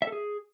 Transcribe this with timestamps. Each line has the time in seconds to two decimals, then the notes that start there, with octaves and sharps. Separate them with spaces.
0.02 E5
0.07 A4
0.12 G#4